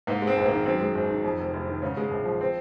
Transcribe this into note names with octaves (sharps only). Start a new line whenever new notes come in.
G#2 A#3
G#3
C4
A#1
A#3
D#3
F#2 C4
G#3
G#1
D#3
F2
F1
F1
D#3
G#2 C#3 C#4
G#3
A#1
F3
C4